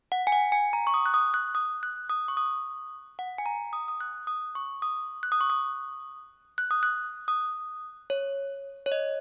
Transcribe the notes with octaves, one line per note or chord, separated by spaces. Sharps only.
F#5
G#5
F#5
G#5
A#5
C#6
D#6
F#6
D#6
F#6
D#6
F#6
D#6
C#6
D#6
F#5
G#5
A#5
D#6
D#6
F#6
D#6
C#6
D#6
F#6
D#6
C#6
D#6
F#6
D#6
F#6
D#6
C#5
C#5
D#5